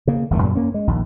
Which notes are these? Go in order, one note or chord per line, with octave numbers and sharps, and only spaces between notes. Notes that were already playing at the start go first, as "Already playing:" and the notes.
C#3 A#3
G1 E2 D#3 A3
F#2 A#2 C#3 G3
A#3 C#4
G#3
A#1 D#2